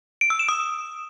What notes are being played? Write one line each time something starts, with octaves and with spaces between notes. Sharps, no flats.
D7
E6
E7
D#6